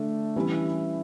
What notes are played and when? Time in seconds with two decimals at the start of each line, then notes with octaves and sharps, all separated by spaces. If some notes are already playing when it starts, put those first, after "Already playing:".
Already playing: D3 A3 D4
0.36 E3 G3 C#4 E4